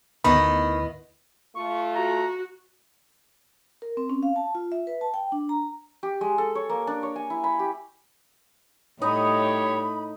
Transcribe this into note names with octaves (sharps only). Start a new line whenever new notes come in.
D2 D#3 B3 E4 D#5 B5
A3 F4 C#6
F#4 A#5
A#4
C4
C#4
F5
A5
F4
E5
B4
A5
G5
D4
A#5
G4
G#3
A4
C#5
A#3
D4
C#5
G#5
E4
B5
G4
A2 G3 D#4 G4 C#5 D#5 B5